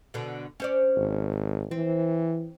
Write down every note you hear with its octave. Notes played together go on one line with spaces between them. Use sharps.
B2 D3
C#4 C5 D5
G#1
E3 C4